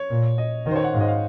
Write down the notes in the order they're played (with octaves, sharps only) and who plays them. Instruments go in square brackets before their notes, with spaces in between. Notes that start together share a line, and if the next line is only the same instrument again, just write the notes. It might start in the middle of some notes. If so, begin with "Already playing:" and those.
Already playing: [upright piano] C#5
[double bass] A#2
[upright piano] D#5
[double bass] D#3 [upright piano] D#5
[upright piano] C5
C#5
F#5
[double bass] G#2 [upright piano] F5
[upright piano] D#5
F5